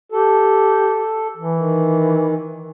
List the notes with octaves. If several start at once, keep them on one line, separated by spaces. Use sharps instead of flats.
G4 A4
E3
D#3